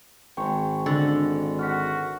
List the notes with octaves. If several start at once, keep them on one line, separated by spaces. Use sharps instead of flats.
G#1 G5 C#6
D3 A6
F#4 F6 B6